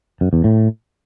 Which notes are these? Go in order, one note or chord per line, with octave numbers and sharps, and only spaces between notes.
F#2
E2
A2